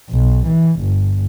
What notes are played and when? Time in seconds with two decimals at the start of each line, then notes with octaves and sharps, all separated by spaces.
0.11 B1
0.47 E3
0.81 G1